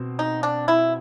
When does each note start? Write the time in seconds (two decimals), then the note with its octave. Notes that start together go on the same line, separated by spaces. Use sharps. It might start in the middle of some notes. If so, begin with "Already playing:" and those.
Already playing: B2 C4
0.19 D#4
0.43 D4
0.68 E4